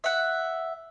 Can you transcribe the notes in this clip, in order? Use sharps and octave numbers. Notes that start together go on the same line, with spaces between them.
E5 F#5